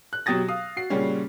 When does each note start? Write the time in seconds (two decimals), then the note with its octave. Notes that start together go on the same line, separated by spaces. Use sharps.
0.13 F#6
0.26 B2 F#3 G4 D#6 A6 A#6
0.48 F5 D#6
0.77 F#4 C7
0.90 A#2 C#3 G3 C#4 F#4